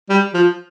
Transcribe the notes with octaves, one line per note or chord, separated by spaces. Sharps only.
G3
F3